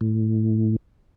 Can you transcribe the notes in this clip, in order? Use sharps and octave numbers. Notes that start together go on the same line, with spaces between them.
A2